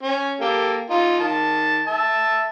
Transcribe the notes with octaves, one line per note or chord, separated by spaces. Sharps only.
C#4
A#3 G4 A4
D#4 F4
D#3 A5
E5 A5